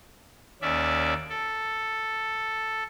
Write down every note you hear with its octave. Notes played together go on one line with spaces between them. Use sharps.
D#2 C#4 D5 E5
A4